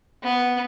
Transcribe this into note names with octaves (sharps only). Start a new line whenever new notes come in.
B3